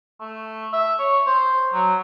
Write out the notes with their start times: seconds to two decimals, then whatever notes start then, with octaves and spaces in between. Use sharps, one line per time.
0.20 A3
0.73 E5
0.99 C#5
1.26 C5
1.74 F#3